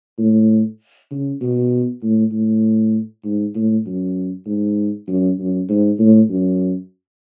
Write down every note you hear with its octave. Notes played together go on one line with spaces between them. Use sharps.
A2
C#3
B2
A2
A2
G#2
A2
F#2
G#2
F#2
F#2
G#2
A2
F#2